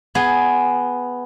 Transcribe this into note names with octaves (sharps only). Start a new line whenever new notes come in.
B3 G#4